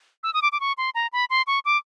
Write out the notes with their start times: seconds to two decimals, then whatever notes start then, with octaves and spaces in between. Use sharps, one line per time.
0.23 E6
0.34 D#6
0.42 D6
0.52 D6
0.60 C#6
0.78 C6
0.95 A#5
1.13 B5
1.30 C6
1.47 C#6
1.65 D6